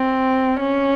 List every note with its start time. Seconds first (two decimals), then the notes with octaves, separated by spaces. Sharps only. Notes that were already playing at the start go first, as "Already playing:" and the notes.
Already playing: C4
0.60 C#4